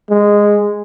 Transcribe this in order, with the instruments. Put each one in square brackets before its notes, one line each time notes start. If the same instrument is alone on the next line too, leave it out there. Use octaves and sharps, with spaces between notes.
[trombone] G#3